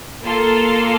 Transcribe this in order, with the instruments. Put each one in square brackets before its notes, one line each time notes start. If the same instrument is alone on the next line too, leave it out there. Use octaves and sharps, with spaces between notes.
[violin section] A#3 F4 A4 C6